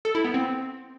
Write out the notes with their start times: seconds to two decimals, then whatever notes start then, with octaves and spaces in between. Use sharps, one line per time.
0.05 A4
0.15 E4
0.25 B3
0.34 C4